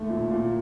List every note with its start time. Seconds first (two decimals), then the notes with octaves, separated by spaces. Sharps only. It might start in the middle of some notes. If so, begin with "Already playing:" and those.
Already playing: D#2 A3
0.09 A#2
0.31 A#2